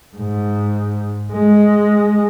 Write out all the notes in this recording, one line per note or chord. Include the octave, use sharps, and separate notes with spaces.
G#2
G#3